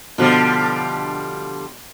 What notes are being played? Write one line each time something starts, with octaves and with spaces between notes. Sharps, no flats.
B2 D3 F3 G3